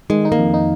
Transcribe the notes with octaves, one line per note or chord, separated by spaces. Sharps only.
D#3 G#3
D#4
A#3
F2
D#4